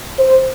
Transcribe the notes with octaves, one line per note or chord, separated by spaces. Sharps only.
C5